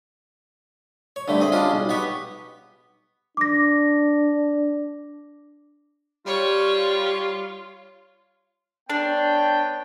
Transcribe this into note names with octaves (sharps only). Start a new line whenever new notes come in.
C#5
G2 D3 A3
C4 G#4
G3 G#3 C#4 D4 F4
B1
B3 G4 C#6
D4 D6 A#6
G3 F4 C#5
B3 D4 C#5 G5